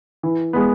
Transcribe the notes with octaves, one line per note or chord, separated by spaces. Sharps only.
E3
G#3 B3